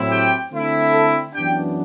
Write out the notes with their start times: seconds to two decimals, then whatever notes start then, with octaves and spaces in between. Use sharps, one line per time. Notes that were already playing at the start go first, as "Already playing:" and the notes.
Already playing: A2 F#3 C4 E4
0.09 G4 G5
0.51 D3 A3 C4 E4
0.92 A4 A5
1.34 F#2 E3 B3 D4 G4 G5